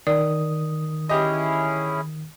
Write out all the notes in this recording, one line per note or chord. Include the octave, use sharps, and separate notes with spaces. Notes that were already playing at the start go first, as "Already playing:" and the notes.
D#3 D5 D#6
C#4 E4 G4 G#4 D#5